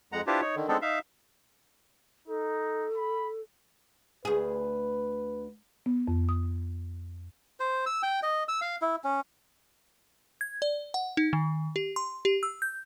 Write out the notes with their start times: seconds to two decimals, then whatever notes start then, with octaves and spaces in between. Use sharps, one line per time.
0.12 F2 G#3 F#5 A#5
0.27 D4 E4 F4 G4 B4 C5
0.41 D#4 C#5
0.56 D3 D#3
0.68 G#3 B3 C4 D4 D#4 A4
0.82 D#4 E5 F5
2.28 D#4 A4
2.97 B5
4.25 D2 G#4 B4
5.86 B3
6.08 F2
6.29 D#6
7.60 C5
7.86 E6
8.03 G5
8.23 D#5
8.48 E6
8.61 F5
8.82 E4
9.04 C#4
10.41 G#6
10.62 D5
10.94 F#5
11.17 D#4
11.33 D#3
11.76 G4
11.96 C6
12.25 G4
12.43 E6
12.62 G6